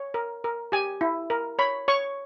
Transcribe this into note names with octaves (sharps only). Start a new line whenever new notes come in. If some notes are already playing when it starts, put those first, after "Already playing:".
Already playing: C#5
A#4
A#4
G4 G#5
E4
A#4
C#5 B5
C#5 C#6